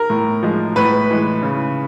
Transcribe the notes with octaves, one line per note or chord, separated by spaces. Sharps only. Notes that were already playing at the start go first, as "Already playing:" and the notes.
Already playing: A#4
A2
F3 G#3
A2 B4
E3 G#3
C#3